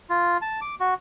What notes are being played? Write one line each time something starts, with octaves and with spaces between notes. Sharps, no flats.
F4
A5
D6
F#4